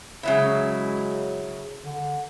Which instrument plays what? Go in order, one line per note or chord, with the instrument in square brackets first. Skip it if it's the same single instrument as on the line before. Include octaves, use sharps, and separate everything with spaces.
[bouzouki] C#3 F#3 E4 [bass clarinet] G#3
[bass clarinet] D3